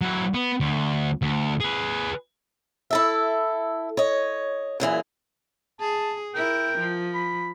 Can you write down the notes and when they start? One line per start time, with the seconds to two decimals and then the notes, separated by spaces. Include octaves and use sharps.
0.01 F#3 E4
0.34 B3
0.60 D2
1.22 D2
1.60 G#4 B4
2.91 E4 A4 E5
3.97 C#5 D#5
4.80 F#2 A#2 E3 G#4
5.80 G#4 A5
6.35 E4 A#4 G5
6.78 F3
7.14 B5